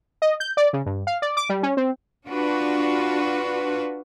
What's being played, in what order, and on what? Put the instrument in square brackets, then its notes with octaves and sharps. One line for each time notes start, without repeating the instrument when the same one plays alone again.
[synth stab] D#5
G6
D5
C#3
G2
F5
D5
D6
G3
C#4
C4
[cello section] D4 F4 F#4 B4